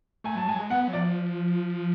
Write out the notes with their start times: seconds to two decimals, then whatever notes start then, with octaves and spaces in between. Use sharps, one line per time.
0.24 A3 G#5
0.35 F#3 A5
0.47 G#3 G#5
0.54 F#3
0.59 G#3
0.70 B3 F#5
0.88 F#3
0.93 F3 D5